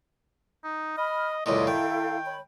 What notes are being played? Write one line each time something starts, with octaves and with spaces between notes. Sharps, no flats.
D#4
D#5 B5 F6
C#2 F#2 A#2 E4 A4 D#5 F5
D#3 G5
C#5 B5